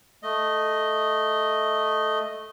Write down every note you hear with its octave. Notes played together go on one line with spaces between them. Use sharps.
A3 D#5